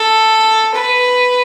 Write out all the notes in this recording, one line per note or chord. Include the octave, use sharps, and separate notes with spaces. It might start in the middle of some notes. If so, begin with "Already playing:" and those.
Already playing: A4
B4